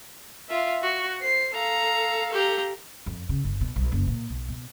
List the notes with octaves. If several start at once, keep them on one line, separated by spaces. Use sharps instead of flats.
F4 E5
F#4
C5 C7
A4 F5 A#5
G4 A#5
F2
C#3
G1
B2
B1
F#1
A#2
B1
B2